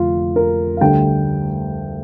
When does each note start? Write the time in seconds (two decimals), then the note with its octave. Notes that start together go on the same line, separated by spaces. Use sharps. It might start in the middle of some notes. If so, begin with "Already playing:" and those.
Already playing: F1 D3 F4
0.36 A#4
0.77 F5
0.81 D2 D3 G3 G5